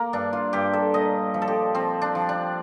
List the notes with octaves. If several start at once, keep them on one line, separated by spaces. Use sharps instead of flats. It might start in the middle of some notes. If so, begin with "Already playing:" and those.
Already playing: A#3
G2 D4
F4
G2 G4
A4
A#2 D#5
F3
A4
G4
F3 C4
D4
F3
D4